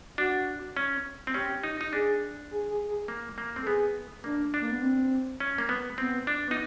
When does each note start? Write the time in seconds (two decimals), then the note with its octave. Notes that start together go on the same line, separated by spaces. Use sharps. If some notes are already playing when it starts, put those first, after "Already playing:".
0.18 D4 F#4
0.77 C#4
1.27 C4
1.34 C#4 G4
1.64 D#4
1.81 D#4
1.93 D4 G#4
2.51 G#4
2.70 G#4
2.88 G#4
3.08 A#3
3.38 A#3
3.56 C4
3.62 A4
3.66 B3 G#4
4.24 A#3 D4
4.54 D4
4.60 A#3
4.71 B3
4.82 C4
5.40 C#4
5.58 A#3
5.69 B3
5.98 B3 C4
6.27 D4
6.47 B3 D#4